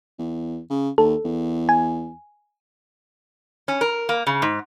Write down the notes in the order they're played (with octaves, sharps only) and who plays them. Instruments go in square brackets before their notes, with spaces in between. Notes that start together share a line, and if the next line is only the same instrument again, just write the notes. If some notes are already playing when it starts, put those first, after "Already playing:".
[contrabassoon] E2
C#3
[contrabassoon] D#2 [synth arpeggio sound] A4
[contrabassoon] E2
[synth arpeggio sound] G#5
[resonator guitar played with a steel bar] C#4
A#4
A#3
C#3
G#2